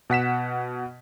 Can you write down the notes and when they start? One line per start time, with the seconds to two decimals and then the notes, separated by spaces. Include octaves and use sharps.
0.10 B2 F#5 B6 E7